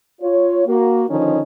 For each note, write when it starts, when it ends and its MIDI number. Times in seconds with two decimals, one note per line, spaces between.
0.21 0.65 65
0.21 0.65 73
0.67 1.04 58
0.67 1.04 66
1.09 1.40 50
1.09 1.40 51
1.09 1.40 53
1.09 1.40 61
1.09 1.40 63